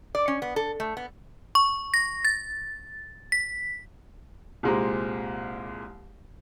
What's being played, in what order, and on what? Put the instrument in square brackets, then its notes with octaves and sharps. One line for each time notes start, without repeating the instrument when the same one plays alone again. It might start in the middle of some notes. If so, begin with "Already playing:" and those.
[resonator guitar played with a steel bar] D5
C#4
B3
A4
A3
B3
[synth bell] C#6
A#6
A6
B6
[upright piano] C2 A#2 G#3 C4 G4 A#5